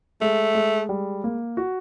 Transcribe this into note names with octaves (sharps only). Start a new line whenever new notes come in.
G#3 A3
G#3
G3
A#3
F#4